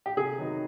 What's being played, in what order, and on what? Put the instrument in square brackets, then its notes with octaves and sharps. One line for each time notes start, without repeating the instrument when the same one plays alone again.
[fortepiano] G4
[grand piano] C3 [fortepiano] G#4
[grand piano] D#3 F#3 B3 D#4